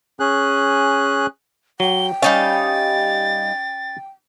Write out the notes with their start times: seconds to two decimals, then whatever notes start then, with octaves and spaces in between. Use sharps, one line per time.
0.20 C#4 G#4 F#6
1.80 F#3 G5 G7
2.22 G3 C#4 D#4 F5 A6